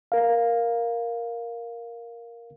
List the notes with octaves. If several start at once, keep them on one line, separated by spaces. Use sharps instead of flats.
A#4 F5